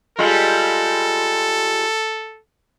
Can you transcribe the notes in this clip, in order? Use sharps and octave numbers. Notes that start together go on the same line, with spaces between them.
G3 G#3 F4 A4